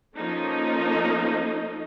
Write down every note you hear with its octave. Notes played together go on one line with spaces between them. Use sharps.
F3 A#3 C#4 D#4 A4 D#5